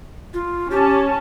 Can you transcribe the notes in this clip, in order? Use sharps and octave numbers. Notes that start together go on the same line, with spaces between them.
F4
C#4 G4 A5